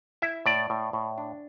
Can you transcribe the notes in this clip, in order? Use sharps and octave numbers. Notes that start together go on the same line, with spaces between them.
E4 E5
A2 D5
A2
A2
D4